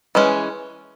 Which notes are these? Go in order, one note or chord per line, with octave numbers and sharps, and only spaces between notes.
E3 G#3 C#4